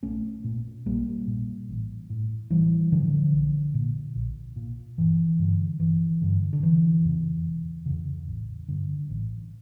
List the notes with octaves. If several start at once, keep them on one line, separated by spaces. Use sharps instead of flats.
A#1 A3 C#4
A#2
A#1 G3 A#3
A#2
A1
A2
A1 E3 G3
A2 D3 F3
A#1
A#2
A#1
A#2
G1 E3
G2 D3
G1 E3
G2 D3
D3
E1 E3
E2 C#3
E1
E2 C#3
A1
G2 D3
A1